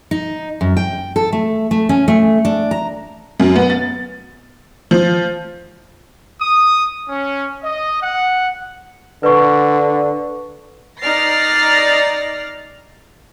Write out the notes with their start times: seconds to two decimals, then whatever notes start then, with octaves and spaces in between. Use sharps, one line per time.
0.11 D#4
0.61 F#2
0.77 G5
1.16 A4
1.33 A3
1.71 A3
1.89 C#4
2.08 A3
2.45 D4
2.71 A#5
3.40 F#2
3.56 B3
3.70 A6
4.91 F3
6.40 D#6
7.08 C#4
7.63 D#5
8.01 F#5
9.23 D3 B4 D5 C#6
11.01 D#4 D5 F6 A6 A#6 C7